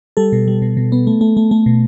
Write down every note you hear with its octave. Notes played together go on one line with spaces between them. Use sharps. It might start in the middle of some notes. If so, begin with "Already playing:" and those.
G3 A4
B2
G3
B2
B2
B3
A3
A3
A3
A3
B2